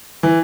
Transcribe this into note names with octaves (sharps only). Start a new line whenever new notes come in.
E3